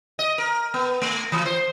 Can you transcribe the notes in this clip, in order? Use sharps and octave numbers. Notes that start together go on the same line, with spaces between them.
D#5
A#4
B3
A3
E3
C5